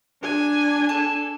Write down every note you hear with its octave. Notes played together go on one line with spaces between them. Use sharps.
D4 G#5
A4